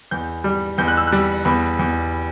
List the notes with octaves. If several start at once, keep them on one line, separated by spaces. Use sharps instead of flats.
E2 G6
G3
E2 G6
F#6
E6
G3 F#6
E2 B5
E2